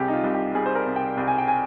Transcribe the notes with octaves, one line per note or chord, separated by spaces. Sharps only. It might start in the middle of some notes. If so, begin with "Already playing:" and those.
Already playing: C2 C3 G3 G4 G#4
D#4
F4
C2
G4
G3 G#4
C5
A#4
C3
G5
C2
G#5
G5
G#5